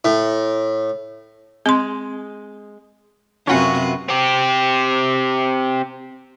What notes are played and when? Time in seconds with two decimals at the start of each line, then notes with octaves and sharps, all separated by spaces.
0.05 A2
1.66 G#3 C4 C6
3.47 F#2 C3 F#3 C#4 F4 F#4 B4 F#5
4.09 C4 G4